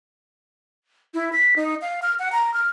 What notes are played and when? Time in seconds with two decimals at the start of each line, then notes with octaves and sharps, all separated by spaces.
1.14 E4
1.33 B6
1.56 D#4
1.82 F5
2.02 F6
2.19 F#5
2.32 A#5
2.54 F6